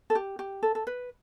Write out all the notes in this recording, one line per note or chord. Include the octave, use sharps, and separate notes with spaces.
A4
G4
G4
A4
A4
B4